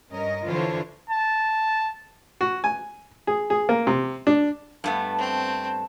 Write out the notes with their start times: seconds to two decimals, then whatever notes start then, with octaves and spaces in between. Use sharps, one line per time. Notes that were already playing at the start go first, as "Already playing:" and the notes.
0.12 G2 C#4 A#4 D#5
0.45 D3 E3 D4 F4 C5 C#5
1.10 A5
2.41 F#4
2.64 G#5
3.27 G#4
3.50 G#4
3.69 A#3
3.87 C3
4.27 D4
4.84 G2 A3 B3 A5
5.18 C4